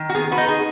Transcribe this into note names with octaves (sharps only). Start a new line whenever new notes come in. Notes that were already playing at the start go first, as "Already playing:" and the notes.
Already playing: D#3
F#4
B3 G#4
F#4 B4
D#4
G#4